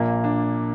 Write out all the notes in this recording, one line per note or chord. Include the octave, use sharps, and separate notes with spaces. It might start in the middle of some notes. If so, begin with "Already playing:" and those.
Already playing: A#1 A#2 A#3
D4